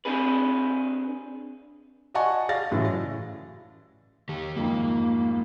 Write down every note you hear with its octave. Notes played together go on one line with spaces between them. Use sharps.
C4 D4 G#4 B4
D5 D#5 F#5 G#5 A5 C#6
G#4 D5 F5 A6 A#6
F#2 A2 C#3 E3
D#3 G4
F#1 F2 G#2 A#3